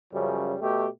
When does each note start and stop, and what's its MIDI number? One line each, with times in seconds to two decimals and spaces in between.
0.13 0.55 42
0.13 0.55 49
0.13 0.55 53
0.13 0.55 55
0.61 0.86 47
0.61 0.86 57
0.61 0.86 67